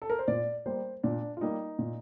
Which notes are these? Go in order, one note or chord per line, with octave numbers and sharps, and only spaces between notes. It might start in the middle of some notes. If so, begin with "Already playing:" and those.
A4
A#4
C5
A#2 D5
G3 A#3 C5
A#2 D4
F4
G3 A#3 D#4
A#2